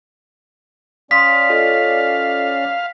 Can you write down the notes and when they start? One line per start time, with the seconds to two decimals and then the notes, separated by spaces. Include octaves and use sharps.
1.11 C#4 D5 F5 C6 D#6 B6
1.49 F4 A4 D#5